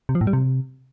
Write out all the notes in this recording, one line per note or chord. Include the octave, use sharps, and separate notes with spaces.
C3
F3
A2
G3
C3